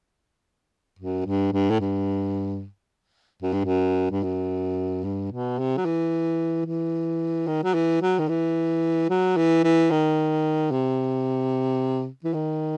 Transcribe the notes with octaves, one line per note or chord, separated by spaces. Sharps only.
F#2
G2
G2
A2
G2
F#2
G2
F#2
G2
F#2
G2
B2
C3
F#3
E3
E3
D#3
F#3
E3
F#3
D#3
E3
F#3
E3
E3
D#3
C3
E3
D#3